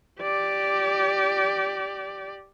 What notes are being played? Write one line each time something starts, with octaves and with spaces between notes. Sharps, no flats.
G4 D5